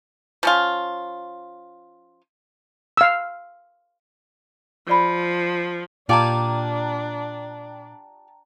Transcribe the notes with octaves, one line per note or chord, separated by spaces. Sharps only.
F3 C#4 F4
F5 E6
F3 G#4 D5 B5
A#2 D4 F4 G4 D5 G5 A5 A#5